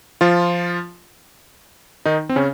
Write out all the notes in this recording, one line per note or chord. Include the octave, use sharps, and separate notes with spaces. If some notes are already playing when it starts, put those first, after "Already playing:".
F3 F4
D#3 D#4
C4
C#3 C#4